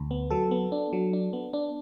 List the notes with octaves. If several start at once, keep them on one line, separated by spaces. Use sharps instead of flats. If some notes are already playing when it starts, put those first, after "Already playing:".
Already playing: D2
B3
F#3 A4
B3
D4
F#3
D4
B3
D4